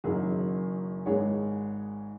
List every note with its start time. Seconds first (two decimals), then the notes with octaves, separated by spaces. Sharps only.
0.04 F#1 F#2 D#3 F#3 G#4
1.06 G#1 G#2 G#3 G#4 C#5